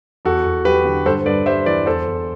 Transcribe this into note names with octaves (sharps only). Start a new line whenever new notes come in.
E2 F#4 A4
E2
F#3 G4 B4
D3
G2 A4 C5
G2 B4 D5
G3 C5 E5
E3 B4 D5
E2 A4 C5
E2